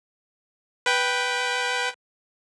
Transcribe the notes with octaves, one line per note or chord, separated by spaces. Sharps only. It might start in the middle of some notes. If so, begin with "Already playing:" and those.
B4 G5